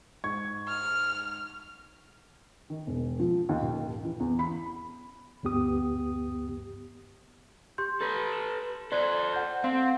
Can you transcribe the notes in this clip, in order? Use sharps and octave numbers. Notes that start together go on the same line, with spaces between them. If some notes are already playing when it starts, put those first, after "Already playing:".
G#2 C#6 G#6
F6
D#3
E1
F3
D#2
D#1
E3
E2
B5
D2 G2 B3 G4 D#6
G4 C6 G6
A4 B4
E7
A4 C5 D5 F#6
F#5 G6
C4 F5 F#5 C6